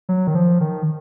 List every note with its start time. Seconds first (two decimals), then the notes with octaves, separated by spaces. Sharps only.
0.09 F#3
0.27 D#3
0.35 F3
0.61 D#3